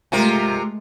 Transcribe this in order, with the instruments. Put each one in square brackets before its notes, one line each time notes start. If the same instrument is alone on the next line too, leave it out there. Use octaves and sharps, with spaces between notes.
[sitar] C3 F4 A#4 [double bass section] G#3 A3